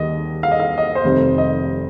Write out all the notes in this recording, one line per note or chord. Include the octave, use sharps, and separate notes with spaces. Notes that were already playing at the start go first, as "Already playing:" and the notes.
Already playing: D#2 D#3 G3 D#5
F5
D#5
F5
D#5
C5
F1 F2 C3 D#3 G3
D#5